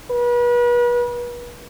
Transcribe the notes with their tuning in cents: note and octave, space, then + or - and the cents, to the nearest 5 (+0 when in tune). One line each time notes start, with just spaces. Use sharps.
B4 -35